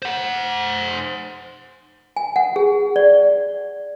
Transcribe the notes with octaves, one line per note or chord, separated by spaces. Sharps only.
C5 F#5
G#5
F#5
G#4
D5